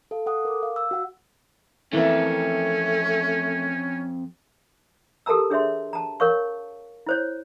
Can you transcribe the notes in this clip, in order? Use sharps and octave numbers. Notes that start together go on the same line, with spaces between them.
A4 F5
A4 F#5 D#6
A#4 D6
F5
E6
F#4 F#5
F2 E3 A3 A#3 C#4 E5
G4 A4 A#4 A5 A#5 E6
D4 G#4 C#5 E5 C6
A5 A#5
A#4 C#5 F5 C#6
E4 C5 C#5